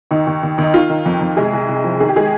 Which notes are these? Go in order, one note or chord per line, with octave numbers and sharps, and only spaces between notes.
D#2 D#4
D#2
D#2
D#2 D#4
D#3 F4
D#3
F2
F2
C2 G#3 G#4
C2
C2
F3
D#3 G#4
G4
D#3 G#3 G#4